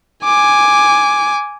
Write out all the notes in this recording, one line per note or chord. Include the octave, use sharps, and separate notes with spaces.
G#5 D6